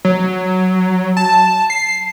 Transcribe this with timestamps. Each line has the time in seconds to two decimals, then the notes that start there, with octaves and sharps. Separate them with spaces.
0.05 F#3
1.17 A5
1.70 C7